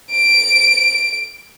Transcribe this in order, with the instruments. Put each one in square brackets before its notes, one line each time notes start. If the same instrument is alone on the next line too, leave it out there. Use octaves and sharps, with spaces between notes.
[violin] D7